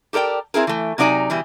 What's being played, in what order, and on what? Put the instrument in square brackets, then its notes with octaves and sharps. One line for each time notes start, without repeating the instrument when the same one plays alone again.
[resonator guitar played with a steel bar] G4 A4 A#4 D5 G5
C4 E4 G#4 A#4
E3 A3
C3 F#3 D#4 D5 G#5 A#5
B2 E3 G3